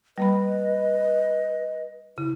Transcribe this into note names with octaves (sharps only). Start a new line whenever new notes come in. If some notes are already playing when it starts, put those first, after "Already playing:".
G3 A#3 B4 D#5 B5
C#3 E4